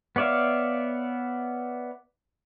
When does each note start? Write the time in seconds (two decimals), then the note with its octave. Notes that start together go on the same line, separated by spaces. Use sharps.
0.16 B3 C#5 D5 E5 F5